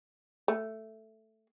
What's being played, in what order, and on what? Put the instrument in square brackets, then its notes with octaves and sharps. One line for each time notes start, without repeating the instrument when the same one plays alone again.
[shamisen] A3